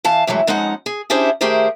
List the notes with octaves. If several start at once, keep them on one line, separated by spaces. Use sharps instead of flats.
E3 F5 A5
G2 E3 F#3 G#3 A3
F2 G#3 C#4 D#4 F#5
G#4
C#4 D4 E4 G4 G#4 C5
D#3 A3 G4 G#4 A#4 C5